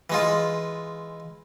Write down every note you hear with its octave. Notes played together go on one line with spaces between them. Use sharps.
E3 G#3 F4